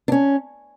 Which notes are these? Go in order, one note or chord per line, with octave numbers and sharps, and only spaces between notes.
D4
C#4